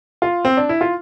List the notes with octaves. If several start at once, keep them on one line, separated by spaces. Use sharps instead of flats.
F4
C4
D4
E4
F4